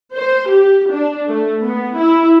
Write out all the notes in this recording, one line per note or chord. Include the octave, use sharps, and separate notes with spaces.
C5
G4
D4
A3
B3
E4